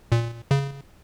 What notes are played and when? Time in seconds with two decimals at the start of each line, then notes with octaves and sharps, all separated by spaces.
0.12 A#2
0.51 C#3